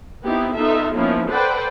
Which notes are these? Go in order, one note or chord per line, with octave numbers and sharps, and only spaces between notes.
B3 C4 D#4 E4 G4
B3 D#4 F4 A4 E5
F3 A#3 B3 C#4 D#4 E4
A4 B4 C5 D5 F#5 G5